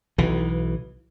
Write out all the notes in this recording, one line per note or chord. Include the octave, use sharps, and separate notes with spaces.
B1 E3